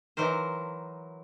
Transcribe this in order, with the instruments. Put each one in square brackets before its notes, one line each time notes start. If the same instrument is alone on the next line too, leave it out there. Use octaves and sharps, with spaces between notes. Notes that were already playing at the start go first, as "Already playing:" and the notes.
[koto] E3 F#3 A#4 C5